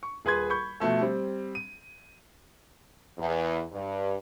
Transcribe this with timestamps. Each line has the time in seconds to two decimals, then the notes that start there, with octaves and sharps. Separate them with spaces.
0.03 C#6
0.25 D#1 G#4 B4 C6 G#6
0.50 B5 C#6 G6
0.80 B2 F3 A3 A4
1.01 G3 C4
1.55 D#7
3.18 E2
3.72 G2